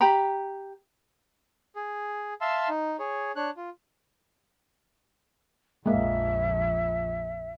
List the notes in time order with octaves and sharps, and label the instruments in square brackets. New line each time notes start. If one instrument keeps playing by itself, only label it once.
[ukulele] G4 G5 A#5 B5
[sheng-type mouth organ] G#4
E5 F5 A5 C6 E6
D#4
G#4 C#5
D4 C#5 F#6
F4
[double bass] A#1 F2 [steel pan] G#3 A#3 [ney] E5